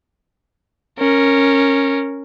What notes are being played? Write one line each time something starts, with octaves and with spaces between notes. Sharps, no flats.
C#4 A#4